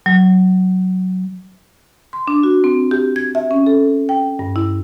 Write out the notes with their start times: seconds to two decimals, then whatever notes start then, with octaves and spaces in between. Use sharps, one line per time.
0.06 F#3
2.13 C6
2.28 D4
2.43 F#4
2.64 C4
2.91 G4
3.16 G#6
3.35 E5
3.51 C#4
3.66 A4
4.09 G5
4.39 G2
4.56 E4